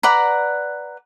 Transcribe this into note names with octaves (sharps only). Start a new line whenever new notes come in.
B4 D5 F#5 A#5